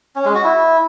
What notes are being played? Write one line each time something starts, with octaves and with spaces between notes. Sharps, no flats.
C#4
G#3
F#4
E4